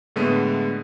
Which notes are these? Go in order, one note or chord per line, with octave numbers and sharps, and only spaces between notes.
A2 D3 G#3 A3 B3 D#7